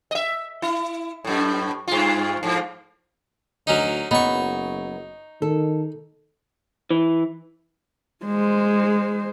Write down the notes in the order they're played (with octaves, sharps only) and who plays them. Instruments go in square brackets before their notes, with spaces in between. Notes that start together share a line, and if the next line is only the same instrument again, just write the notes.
[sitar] D#5 E5
E4
F#2 A2
G2 F4
G#2 F3
[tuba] D2 [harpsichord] F#3 C#4 D#4
[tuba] F#1 [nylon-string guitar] F#3 B3 B4 [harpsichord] D#4 C#6
[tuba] D#3 [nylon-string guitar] A4
[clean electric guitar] E3
[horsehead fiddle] G#3 C5